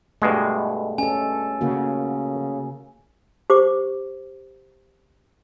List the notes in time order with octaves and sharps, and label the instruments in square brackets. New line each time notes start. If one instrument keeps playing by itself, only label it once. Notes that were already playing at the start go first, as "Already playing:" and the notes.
[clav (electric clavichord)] G2 B2 G#3 [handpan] A3
[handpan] C#4 A4 [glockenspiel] G#5
[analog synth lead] C#3 [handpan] A#3 F#4
[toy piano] G4 C5 D6